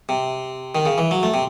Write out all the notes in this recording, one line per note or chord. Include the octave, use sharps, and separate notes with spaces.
C3
D#3
C#3
E3
F#3
A3
C3